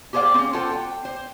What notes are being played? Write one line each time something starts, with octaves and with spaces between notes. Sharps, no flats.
G4 G#4 C5 D5 F5 G5
C4 C#4
F4 F#4 A4 C5 G5
G5
C5